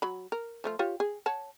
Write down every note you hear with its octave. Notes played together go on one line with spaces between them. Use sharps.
F#3 B5
A#4
F3 A3 F4
F4 G4 C#5
G#4
C#5 F#5 A5